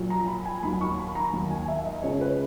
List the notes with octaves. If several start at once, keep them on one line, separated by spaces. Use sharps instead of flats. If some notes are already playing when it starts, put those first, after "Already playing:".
Already playing: A#1 A#2 F#3
A#5
B5
G#5
D#2 D#3 F#3 B5
C#6
B5
A#5
D#2 D#3 F#3
G#5
E5
D#5
C#2 C#3 G#3 C#5
B4